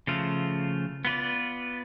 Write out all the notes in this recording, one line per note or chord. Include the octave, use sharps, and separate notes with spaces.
C#3 F3 A3 F4
B3 F4 B4 D5